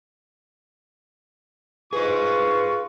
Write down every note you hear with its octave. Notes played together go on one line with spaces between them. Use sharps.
F4 G#4 B4 C5 C#6